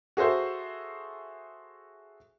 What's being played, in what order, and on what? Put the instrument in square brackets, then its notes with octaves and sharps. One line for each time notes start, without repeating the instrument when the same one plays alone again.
[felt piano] F#4 G#4 A4 C5 E5